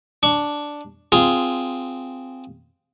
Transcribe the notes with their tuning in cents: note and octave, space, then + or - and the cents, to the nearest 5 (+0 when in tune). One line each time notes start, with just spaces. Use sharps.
D4 +0 C#6 +20
C4 -10 F4 +0 G#4 +0